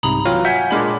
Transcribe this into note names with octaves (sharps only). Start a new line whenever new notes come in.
C2 G#2 C3 A#5 B5 D#6
E3 F#3 F4 C#5 G5
E5 F#5 G#5 G6 G#6 B6
A#2 G#3 D4 B5 F6